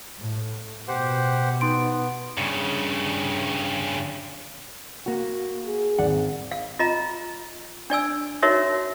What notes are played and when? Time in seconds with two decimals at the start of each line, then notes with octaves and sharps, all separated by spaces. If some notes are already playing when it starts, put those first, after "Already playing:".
0.19 A2
0.88 B2 G4 C5 F#5
1.61 B3 D#4 C6 D7
2.38 G2 C#3
5.06 A#3 F#4
5.66 G#4
5.99 G#1 D5 F#5
6.51 F5
6.79 F4 D#5 A#5
7.90 D4 D5 G#5 E6
8.43 D#4 F#4 A#4 C#5 E5